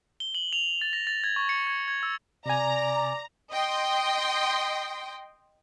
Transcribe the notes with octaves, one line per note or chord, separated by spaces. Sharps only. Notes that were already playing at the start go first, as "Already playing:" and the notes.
G7
F#7
F7
A6
A#6
A6
G#6
C#6
C#7
G#6
G#6
E6
C3 D5 G#5 A#5
D#5 G5 C6